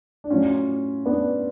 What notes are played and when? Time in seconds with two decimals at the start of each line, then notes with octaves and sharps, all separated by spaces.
0.24 D4
0.30 A2 F#3 C#4 F4
1.05 B3 D4